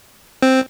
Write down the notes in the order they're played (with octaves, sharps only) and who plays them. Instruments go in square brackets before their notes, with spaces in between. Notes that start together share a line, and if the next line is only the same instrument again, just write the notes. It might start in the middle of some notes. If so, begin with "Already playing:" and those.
[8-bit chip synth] C4